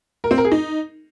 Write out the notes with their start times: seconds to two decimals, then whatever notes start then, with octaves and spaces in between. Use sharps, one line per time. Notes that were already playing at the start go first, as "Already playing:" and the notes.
0.24 A#4
0.31 C4
0.38 A#4
0.45 G#4
0.52 D#4